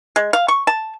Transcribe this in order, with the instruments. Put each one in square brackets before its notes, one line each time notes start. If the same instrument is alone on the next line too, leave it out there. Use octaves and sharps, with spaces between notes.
[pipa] G#3
F5
C#6
A5